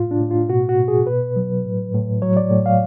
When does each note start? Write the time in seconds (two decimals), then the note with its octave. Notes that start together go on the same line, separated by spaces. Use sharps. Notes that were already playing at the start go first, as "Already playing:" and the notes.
Already playing: A2 F4
0.11 D4
0.21 A2
0.31 F4
0.49 B2 F#4
0.69 F#4
0.78 B2
0.88 G#4
1.07 B2 B4
1.36 F#3
1.65 A2
1.94 A2
2.22 F#3 C#5
2.37 D5
2.51 A2
2.66 F5